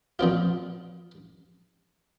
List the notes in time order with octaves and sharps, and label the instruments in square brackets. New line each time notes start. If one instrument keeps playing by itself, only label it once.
[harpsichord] A#2 F3 C4 F4